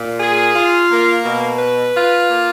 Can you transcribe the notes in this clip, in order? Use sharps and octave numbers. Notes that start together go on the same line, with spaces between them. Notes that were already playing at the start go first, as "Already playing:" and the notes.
Already playing: A#2
G#4
F4
A#3
B2
B4
F4
A#3